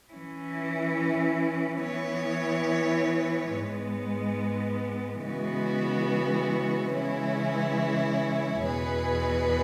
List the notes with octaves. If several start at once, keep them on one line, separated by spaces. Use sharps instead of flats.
E3 C#4 E4
E3 B3 E4 C#5
G#2 G#3 B3
C#3 E3 G#3 B3 F#4
C#3 E3 G#3 C#4 E4
E2 B2 B3 G#4 B4